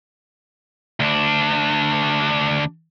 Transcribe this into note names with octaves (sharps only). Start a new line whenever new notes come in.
D2 D4